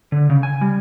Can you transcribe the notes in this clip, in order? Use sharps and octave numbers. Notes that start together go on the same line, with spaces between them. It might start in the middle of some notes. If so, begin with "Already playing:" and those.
D3
C#3
G#5
G3